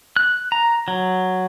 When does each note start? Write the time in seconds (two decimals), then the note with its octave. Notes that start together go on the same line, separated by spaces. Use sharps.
0.16 F#6
0.52 A#5
0.88 F#3